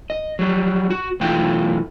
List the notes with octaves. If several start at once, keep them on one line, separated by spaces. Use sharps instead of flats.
D#5
F#3 G3
F#4
B1 E3 A3 F4 G5